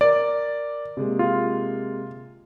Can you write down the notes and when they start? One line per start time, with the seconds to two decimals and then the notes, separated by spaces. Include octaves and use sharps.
0.01 A#4 D5
0.97 C3 G#3 A#3
1.19 F4